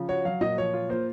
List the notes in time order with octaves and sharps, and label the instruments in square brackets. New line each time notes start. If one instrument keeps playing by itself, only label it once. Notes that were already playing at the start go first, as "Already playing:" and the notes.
Already playing: [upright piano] C#3 F3
[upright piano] F#4 [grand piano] C#5
[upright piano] F#3 [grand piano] F5
[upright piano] A#2 [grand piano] D#5
[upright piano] F3 [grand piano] C#5
[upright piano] F4
[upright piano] A#3 [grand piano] C5